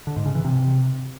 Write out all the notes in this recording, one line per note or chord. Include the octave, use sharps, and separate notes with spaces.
D3
G#2
C#3
E3
C3